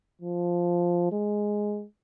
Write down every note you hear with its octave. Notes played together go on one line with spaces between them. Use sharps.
F3
G#3